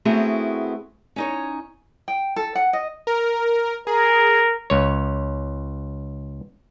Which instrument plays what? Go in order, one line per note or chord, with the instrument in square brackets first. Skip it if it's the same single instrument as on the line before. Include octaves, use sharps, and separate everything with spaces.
[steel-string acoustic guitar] A3 B3 C4 E4 F#4 G#4
C#4 D#4 C#5
[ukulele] G5
A4
F#5
D#5
[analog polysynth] A#4
[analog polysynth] G#4 [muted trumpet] A#4
[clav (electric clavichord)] C#2 C#5